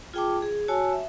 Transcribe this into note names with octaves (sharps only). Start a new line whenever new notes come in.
F4 G#4 G5 A5 D6
G#4
F#4 C#5 G#5 A5 E6
E5